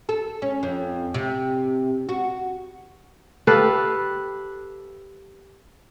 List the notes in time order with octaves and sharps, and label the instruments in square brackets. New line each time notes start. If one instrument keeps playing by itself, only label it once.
[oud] A4
C#4
F2
C3
F#4
[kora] G4 A4 B4 F5